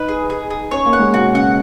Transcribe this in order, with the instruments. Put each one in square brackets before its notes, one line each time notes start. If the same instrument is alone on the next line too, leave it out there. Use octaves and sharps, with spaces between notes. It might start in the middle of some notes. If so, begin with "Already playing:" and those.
Already playing: [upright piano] D#4 [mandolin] B4
[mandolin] G#4
G#4
G#4
[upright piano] C#4 [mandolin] C#5
[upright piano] A#3
[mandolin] F#5
[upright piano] G#3
[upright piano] B2 [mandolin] F#4
[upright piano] C#3 [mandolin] F#5